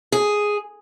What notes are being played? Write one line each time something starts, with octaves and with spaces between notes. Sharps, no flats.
G#4